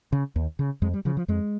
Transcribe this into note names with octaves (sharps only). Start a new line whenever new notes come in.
C#3
D#2
C#3
F2 G#3
G3
C#3 F3
F3
F2 G#3